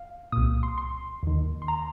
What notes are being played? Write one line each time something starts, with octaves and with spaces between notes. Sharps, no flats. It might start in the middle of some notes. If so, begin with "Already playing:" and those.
Already playing: F5
C2 A#2 D#6
C6
C6
D#2 D#3
C6
A#5